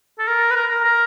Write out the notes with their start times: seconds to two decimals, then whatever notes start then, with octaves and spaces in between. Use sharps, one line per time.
0.19 A4
0.28 A#4
0.51 B4
0.56 A#4
0.71 A#4
0.85 A#4